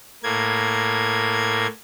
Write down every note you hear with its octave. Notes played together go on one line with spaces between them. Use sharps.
A2 A#3 G#6